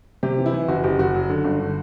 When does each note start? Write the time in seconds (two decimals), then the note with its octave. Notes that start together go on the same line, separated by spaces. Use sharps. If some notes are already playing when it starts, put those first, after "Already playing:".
0.23 C3 G4
0.38 E3
0.46 E4
0.53 E3
0.68 F#1 F#4
0.84 F#1 G4
0.99 F#1 F#4
1.14 F#3
1.29 D3
1.44 G1
1.60 D3